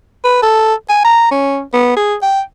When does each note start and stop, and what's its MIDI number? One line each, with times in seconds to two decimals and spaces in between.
0.24 0.38 71
0.42 0.74 69
0.89 1.03 80
1.04 1.28 82
1.31 1.61 61
1.73 1.96 59
1.97 2.15 68
2.22 2.41 79